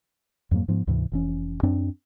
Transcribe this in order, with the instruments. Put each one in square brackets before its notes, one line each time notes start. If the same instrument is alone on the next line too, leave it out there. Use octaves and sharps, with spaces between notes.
[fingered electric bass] F2 G#2 F#3 A#3
G#2 F3 B3
D2 G#2 C3 E3
F1 E3 C#4
F#2 C4 D4